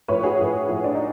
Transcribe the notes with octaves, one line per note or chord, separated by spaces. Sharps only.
A2 F3 B4 C#5
F#4 G#4
A2 F3
A2 F3
D4
D#4